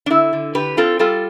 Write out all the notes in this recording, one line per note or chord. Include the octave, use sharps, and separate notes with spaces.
D4
D3 E4
D3
D3 G4 B4
C4 F4 A4
G3 F4 A4